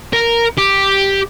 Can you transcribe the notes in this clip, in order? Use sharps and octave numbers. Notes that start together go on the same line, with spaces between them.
A#4
G4